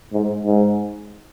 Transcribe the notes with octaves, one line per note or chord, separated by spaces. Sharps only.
G#2
G#2